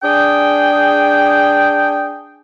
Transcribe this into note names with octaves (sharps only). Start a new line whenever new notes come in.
D4 G#4 G5